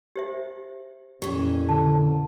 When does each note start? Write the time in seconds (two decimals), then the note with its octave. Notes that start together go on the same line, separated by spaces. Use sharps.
0.16 G4 C5 E5
1.22 F2 A#2 E3 C#4 G4 C#6
1.69 D3 A5